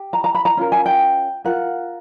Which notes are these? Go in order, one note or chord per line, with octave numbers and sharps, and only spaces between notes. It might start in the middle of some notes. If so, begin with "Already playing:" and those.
Already playing: G4
A#5
A#5
B5
A#5
C#4 F4 A#4
G#5
G5
F4 A#4 F#5